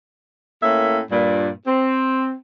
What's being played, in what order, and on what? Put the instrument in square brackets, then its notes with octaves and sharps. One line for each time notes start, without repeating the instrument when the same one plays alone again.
[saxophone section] A2 A#3 C#4 E5
G2 A#2
C4